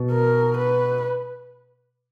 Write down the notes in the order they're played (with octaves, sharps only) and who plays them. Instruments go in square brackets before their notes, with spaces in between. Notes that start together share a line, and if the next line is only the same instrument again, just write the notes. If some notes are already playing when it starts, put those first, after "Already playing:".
Already playing: [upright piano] B2
[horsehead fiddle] A#4
B4